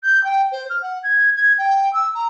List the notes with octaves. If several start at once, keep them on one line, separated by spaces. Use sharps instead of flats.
G6
G5
C5
F6
F#5
G#6
G#6
G5
E6
A#5